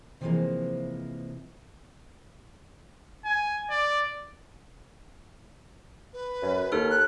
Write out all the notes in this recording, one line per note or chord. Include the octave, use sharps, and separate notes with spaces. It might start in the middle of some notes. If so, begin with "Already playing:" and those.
C3 E3 F3 G3 G#3 A#3
G#5
D5
B4
F#2
D#2 D#4 A4 F6
F#6